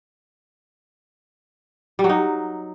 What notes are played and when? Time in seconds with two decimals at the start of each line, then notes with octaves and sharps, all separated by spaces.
1.99 G3
2.04 F#3
2.09 D#4